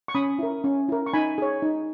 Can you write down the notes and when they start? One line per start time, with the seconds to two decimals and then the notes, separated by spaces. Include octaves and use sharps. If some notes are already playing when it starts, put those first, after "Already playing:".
0.08 C#6
0.15 C#4 B5 D#6
0.39 E4 A#4
0.64 C#4
0.89 E4 A#4
1.06 C#6
1.14 D#4 G#5 B5
1.38 G#4 C#5
1.62 D#4